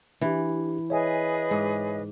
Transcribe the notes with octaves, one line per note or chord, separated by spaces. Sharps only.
E3 D4 G4
G#4 B4 C#5 D#5 E5 G#5
G#2